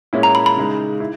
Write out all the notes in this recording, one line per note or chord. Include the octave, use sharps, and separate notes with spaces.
A#2 G#3 C#4 E4
A#5
B5
B5
C#3 G#3 D#4
E4